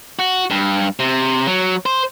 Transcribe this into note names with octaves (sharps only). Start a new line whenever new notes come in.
F#4
G2
C3
F#3
C5